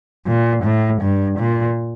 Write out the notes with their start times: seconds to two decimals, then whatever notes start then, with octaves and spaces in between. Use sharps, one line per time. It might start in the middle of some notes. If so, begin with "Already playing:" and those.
0.27 A#2
0.64 A2
1.01 G2
1.39 A#2